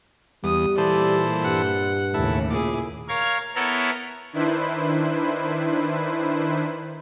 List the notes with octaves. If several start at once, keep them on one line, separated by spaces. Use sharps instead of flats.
E2 G3 D#6
A#2 E3 A4 C5 D5
G2 F#5
D#2 A2 C#3 E4 A4
A#2 E4 G#4 D6
A#4 C#5 F5 G#6
B3 E4 A4 A#4 C#5
D#3 D4 E4 B4 C5